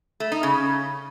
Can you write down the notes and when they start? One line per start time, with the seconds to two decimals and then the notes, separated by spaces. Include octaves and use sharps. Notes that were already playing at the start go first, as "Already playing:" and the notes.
0.20 A3
0.32 D#4
0.43 C#3